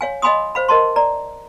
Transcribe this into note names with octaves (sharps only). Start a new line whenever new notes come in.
C#5 F5 G#5
D#5 F5 G#5 B5 C6 D#6
C5 F5 B5
A#4 D#5 A5 C6
D5 A#5